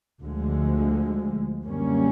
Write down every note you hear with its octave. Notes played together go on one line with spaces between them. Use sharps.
D2 D3 F3 G#3
F#2 D3 G3 A#3 C#4